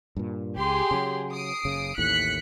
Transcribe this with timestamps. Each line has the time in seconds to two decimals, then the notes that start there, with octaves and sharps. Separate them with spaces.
0.17 G2 A#2
0.57 C#2 G4 G#4 C6
0.91 C#3 F#3
1.34 D#6 C7 D7
1.65 F#1 C#3
1.98 A1 D#2 A2 F#6 B6 C#7